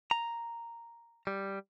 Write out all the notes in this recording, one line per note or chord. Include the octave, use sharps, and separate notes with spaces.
A#5
G3